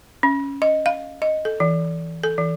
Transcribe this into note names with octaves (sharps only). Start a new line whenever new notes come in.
C#4
D#5
F5
D#5
A4
E3
A4
E3